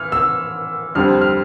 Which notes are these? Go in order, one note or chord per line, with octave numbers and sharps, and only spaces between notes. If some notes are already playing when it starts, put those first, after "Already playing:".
Already playing: E3 F6
E6
F2 D3 G3 C4 F6
F6